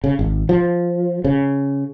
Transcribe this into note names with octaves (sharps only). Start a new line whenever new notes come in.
C#3
G#1
F3
C#3